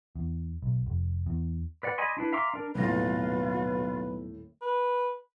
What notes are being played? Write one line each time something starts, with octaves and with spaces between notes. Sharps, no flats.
E2
B1
F1
E2
B4 D5 F#5
D5 D#5 G#5 B5 C6
D4 E4 B4
E5 F5 A#5 C6 D6
D4 A#4
D#1 B1 A2 F4 B4 A#6
B4